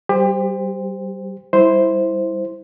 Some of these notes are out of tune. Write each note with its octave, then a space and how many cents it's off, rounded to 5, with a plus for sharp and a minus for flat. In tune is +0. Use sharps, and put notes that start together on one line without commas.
G3 -25 G4 +30 C5 -15
G3 +0 E4 -10 C5 -5